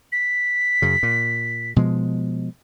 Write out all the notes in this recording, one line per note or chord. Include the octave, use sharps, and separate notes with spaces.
B6
F#2 C#3
A#2
B2 F3 G#3